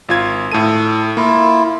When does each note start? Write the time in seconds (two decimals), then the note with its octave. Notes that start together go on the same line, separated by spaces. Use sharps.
0.09 G#1 F4 G#6
0.52 A2 A4 D#7
1.17 A#3 E4 F4